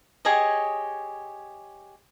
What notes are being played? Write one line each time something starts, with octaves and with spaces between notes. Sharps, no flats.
G4 G#4 C#5 D#5